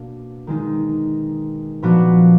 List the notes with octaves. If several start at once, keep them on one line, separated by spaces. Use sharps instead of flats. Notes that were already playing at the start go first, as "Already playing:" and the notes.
Already playing: B2 A#3 D4
D#3 G#3 D#4
A#2 F3 B3 D4 F#4